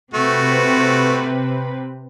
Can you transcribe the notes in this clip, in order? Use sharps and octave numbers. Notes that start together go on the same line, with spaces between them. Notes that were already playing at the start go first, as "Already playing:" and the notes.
C3 A3 C4 F#4 B4